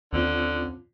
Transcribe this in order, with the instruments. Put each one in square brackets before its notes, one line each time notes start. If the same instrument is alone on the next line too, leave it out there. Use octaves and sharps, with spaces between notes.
[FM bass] D#2 [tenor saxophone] D3 [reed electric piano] C4 C#4 F4